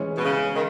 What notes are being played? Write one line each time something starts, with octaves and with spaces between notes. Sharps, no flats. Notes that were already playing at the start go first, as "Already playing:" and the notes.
Already playing: E3 G#3 C#4
B2
C#3
D#3